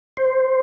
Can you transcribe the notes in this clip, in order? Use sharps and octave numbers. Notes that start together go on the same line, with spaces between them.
C5